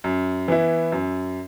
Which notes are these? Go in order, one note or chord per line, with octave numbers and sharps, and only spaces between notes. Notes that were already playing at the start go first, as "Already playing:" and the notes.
F#2
E3 B3 E4
F#2